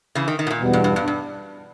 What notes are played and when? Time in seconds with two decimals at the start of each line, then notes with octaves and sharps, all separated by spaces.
0.15 C#3 E3
0.28 D#3
0.39 D#3
0.47 B2
0.51 A#2
0.61 E2 B2 G3 B3
0.73 G2
0.84 G2
0.96 G2
1.08 G2